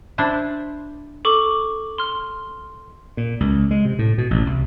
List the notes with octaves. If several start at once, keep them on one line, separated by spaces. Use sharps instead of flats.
D4 E4 C5
A4 C#6 D6
C6 F6
A#2
C#2
G#3
C3
A2
B2
A1
C2